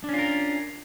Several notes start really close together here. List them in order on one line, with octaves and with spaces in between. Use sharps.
D4 C#4 F4 A#4